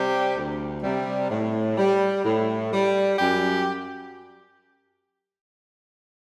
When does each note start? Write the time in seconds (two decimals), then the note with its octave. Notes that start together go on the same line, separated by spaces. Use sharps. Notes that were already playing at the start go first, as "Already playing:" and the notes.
Already playing: C3 G3 G4
0.36 D2
0.83 C3 G3
1.30 A2
1.77 G3
2.24 A2
2.72 G3
3.19 F#2 G4